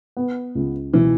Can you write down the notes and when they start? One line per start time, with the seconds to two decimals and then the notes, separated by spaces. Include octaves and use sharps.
0.17 B3
0.55 C#2
0.94 B2 E3